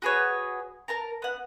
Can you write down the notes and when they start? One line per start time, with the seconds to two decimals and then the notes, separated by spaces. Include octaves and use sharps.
0.02 F#4 G#4 B4 C#5
0.88 A#4 A5 A#5
1.22 B3 F#5